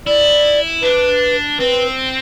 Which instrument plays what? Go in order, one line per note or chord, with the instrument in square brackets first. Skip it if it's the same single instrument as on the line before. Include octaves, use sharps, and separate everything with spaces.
[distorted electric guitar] E4 [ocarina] D5
[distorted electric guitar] D4 [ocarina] B4
[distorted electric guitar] C4 [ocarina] B4